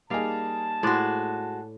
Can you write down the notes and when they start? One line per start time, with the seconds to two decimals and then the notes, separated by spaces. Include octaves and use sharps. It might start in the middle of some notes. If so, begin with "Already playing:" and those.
0.10 G3 A#3 D#4 G#4 F5 A5
0.83 A2 G#3 F#4 C5 D5